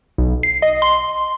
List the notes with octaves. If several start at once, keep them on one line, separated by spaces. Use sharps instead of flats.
B1
C7
D#5
C6